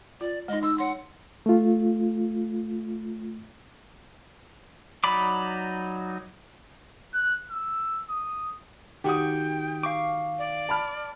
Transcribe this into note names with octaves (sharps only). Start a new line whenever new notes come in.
F4 D5
G#3 D#4 D#5
D#4 E6
C#5 F#5 C6
A3 F4
F#3 D#4 D5 B5 D6
F#6
E6
D#6
D#3 F#4 G4 G5 D#6
F5 C#6 D6
D5
A5 B5 F6